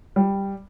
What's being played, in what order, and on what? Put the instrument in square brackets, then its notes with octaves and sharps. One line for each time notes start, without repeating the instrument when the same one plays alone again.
[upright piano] G3